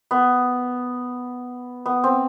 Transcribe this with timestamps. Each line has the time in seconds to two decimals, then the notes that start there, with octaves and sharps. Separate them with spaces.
0.11 B3
1.86 B3
2.04 C4